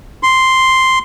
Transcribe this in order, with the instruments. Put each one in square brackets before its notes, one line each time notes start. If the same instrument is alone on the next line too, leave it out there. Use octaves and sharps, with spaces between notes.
[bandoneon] C6